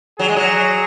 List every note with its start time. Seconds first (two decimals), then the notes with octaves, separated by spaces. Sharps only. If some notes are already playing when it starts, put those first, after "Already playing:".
0.19 F#3 G#4
0.28 G#3
0.36 F#3